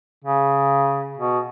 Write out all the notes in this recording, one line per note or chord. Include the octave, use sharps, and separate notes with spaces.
C#3
B2